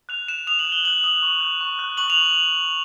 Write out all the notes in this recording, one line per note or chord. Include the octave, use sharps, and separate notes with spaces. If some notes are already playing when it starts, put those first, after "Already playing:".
F#6 F7
F#6 E7
D#6 F7
F#7
F#6
G7
F#6 F#7
D#6 F#7
C#6
F#6
C#6
F#6
C#6 F#7
F7